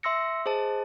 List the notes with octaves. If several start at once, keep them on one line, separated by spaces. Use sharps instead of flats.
E5 C6 E6 A#6 C#7
G#4 C5 D#5 A5